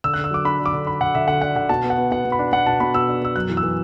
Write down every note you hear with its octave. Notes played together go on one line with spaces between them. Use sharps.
D3 E6
F#6
D3
E6
F#3 D6
D4 B5
D3
D6
D3
D4 B5
D3 F#5
D3 E5
D3 F#5
D3 F#5
D3 F#5
B2 A5
B3
F#5
B3
B2 F#5
B2
B5
D4
B2 F#5
B2 A5
B2 B5
B2 E6
D4
B2 E6
F#2 F#6
E3
E6
E3